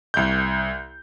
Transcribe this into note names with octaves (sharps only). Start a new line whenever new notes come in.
C2 G6